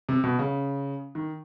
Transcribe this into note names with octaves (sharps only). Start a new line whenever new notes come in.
C3
B2
C#3
D#3